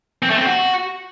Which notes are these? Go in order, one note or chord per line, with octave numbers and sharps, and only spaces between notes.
C4
A3
C4
F#4